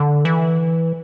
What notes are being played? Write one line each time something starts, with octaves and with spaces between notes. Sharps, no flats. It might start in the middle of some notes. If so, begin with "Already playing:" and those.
Already playing: D3
E3